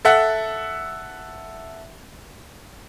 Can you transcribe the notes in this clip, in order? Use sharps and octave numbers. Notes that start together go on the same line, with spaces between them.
A4 E5 F#5 F#6